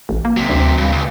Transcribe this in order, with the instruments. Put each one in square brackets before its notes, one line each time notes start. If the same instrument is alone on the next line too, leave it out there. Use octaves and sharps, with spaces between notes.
[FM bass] A1
A#3
[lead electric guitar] C3 F#3
[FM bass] D2
[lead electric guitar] C#2 G2
C#2